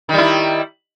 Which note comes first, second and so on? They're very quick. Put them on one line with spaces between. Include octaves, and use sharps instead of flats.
D#3 G3 E4